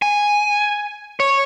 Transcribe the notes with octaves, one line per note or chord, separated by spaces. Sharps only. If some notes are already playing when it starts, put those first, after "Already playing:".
G#5
C#5